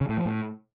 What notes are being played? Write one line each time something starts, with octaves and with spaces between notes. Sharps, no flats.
C#3
A2
F3
A2